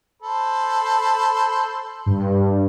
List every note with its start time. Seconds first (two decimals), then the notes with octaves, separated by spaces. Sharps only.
0.22 A4 C5 B5
2.06 G2